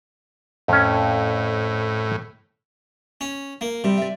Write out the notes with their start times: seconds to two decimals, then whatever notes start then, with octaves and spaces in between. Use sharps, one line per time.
0.68 F2 A2 C#4
3.21 C#4
3.61 A#3
3.84 C3 G3
3.97 D5 E5